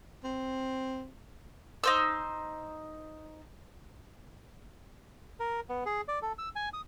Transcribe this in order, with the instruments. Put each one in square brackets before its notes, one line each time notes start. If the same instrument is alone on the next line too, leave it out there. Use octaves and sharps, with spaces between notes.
[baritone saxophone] C4
[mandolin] D#4 C5 E6
[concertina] A#4
B3
G#4
D5
A4
E6
G#5
D#6